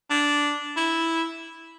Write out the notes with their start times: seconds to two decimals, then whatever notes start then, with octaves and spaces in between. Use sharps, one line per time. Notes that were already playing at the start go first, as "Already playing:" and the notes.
0.10 D4
0.77 E4